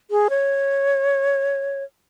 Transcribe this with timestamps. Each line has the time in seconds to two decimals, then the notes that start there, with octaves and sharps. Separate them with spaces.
0.11 G#4
0.30 C#5